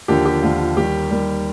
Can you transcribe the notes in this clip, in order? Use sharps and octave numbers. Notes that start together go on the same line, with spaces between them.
D#2 D3 F3 G4
G4
D#2 D3 F3 F4
F4
D#2 D#3 G3 G4
D#2 D#3 G3